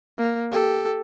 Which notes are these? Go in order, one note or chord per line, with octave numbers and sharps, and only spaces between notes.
A#3
G4 A4